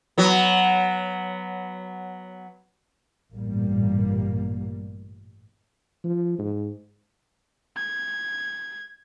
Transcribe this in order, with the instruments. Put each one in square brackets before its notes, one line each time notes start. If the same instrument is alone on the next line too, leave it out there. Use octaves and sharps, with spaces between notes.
[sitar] F#3 B3
[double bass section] A1 G2 A#2 G3 A#3
[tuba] F3
G#2
[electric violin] G#6